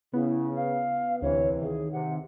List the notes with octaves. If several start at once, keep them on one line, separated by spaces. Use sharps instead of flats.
C#3 B3 E4
F5
D2 C3 E3 C#5
D#3 G#4
C3 F#5